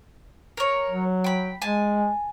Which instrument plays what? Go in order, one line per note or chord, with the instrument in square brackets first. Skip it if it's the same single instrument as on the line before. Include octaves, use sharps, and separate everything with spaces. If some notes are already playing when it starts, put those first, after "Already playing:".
[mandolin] A#4 C#5
[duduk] F#3
[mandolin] G5 B5
[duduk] G#3 [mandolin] G#5 A5